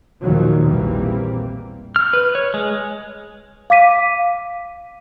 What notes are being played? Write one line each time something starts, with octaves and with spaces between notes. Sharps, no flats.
D#2 A#2 D#3 F3 F#3
A#1 E2 E3 G3 A#3 C4
F6
B4
C#5
G#3
F5 D6 B6 D#7